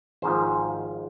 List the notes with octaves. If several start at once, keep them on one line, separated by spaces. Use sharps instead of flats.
G#1 G#2 F3 C5